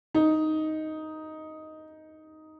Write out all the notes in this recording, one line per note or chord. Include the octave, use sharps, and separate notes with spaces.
D#4